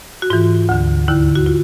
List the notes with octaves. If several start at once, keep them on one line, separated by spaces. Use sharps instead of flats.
F#4
G#2 E3 F4
D2 D3
D#2 D3 E4
F#4
F4